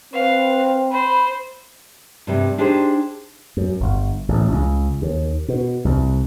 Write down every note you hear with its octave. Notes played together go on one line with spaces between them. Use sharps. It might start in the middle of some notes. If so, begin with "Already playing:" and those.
C4 B4 F5
C5 B5
G2 C3 G3
D4 D#4 G4 G#4 C5
F#2
G1
A1
C#2
D#2
B2
C2